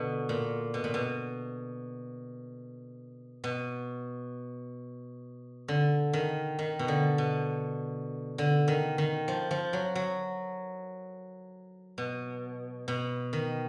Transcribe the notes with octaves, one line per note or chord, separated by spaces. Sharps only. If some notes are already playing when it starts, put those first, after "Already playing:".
Already playing: B2 D3
A#2
B2
A#2
B2
B2
D3
D#3
D#3
B2
D3
B2
D3
D#3
D#3
F3
F3
F#3
F#3
B2
B2
D#3